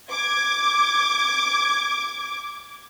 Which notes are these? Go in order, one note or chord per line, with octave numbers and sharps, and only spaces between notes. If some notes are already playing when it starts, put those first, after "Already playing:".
D6 G#6